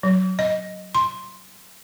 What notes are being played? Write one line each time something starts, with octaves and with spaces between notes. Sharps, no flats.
F#3
D#5
C6